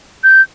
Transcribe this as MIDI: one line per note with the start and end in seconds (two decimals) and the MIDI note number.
0.24 0.42 91